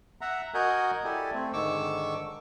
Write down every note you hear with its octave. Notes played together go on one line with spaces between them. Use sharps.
E5 F#5 A#5
F#4 A#4 D#5 F#5 G#5 G6
E4 G4 A4 D5 G#5
A3 C4
G#2 D3 D#3 C#6 D6 E6